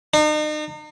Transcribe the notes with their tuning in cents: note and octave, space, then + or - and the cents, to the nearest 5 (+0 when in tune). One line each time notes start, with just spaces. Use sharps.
D#4 -40